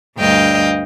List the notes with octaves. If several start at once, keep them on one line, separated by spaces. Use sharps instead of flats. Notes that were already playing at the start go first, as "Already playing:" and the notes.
D2 G2 D#5 F5 G5